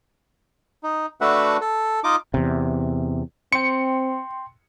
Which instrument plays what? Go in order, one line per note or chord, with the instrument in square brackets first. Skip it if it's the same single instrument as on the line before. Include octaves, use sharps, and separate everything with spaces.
[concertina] D#4
A3 D4 F#4 B4 E5 F#5
A4
D#4 F4 D#5 D6
[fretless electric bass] E2 C3
[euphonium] C4 [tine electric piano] G5 C6 [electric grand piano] C#7